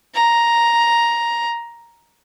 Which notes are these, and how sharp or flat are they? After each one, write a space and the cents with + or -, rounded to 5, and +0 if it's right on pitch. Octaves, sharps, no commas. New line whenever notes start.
A#5 +5